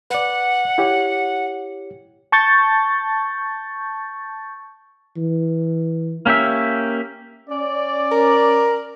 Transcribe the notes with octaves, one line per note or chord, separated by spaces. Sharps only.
B4 D5 F#5
E4 G4 C#5
A5 C#6 G6 A6
E3
A#3 C#4 G4 E5
C#4 D5
A#4